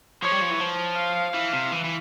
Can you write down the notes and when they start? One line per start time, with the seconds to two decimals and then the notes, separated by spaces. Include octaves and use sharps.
0.22 F3 C#5
0.31 G3
0.41 F3
0.50 E3
0.60 F3
0.96 F5
1.34 E3
1.53 C3
1.72 E3
1.84 E3